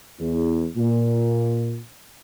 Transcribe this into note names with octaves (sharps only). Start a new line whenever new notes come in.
E2
A#2